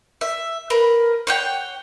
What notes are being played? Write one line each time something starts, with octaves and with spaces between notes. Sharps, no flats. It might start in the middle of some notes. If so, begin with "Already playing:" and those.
E5
A#4 B4
C#5 F#5 G5